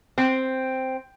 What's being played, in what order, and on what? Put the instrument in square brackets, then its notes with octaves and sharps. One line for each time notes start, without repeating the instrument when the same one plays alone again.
[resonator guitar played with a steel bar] C4